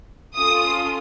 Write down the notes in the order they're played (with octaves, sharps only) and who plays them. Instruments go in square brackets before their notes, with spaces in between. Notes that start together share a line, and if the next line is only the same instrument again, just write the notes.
[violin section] C#4 F4 A4 D#6